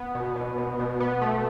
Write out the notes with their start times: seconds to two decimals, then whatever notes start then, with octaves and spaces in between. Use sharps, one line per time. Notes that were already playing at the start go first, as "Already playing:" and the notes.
Already playing: B3
0.15 B2
0.36 B2
0.58 B2
0.79 B2
1.00 B3
1.22 A3